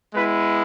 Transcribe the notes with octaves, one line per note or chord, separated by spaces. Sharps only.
G#3 B3 E4 B4